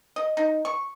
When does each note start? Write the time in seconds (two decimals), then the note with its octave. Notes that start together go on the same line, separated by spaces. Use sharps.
0.16 D#5
0.37 D#4
0.65 C#6